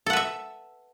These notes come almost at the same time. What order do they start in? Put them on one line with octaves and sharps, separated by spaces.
A4 F#5 B4 E5